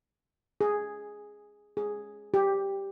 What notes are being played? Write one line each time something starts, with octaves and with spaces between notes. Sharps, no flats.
G#4
G#4
G4